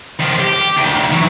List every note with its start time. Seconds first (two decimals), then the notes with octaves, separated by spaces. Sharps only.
0.20 D#3 F3
0.40 G4
0.77 D2 D#3
1.12 E3 F#3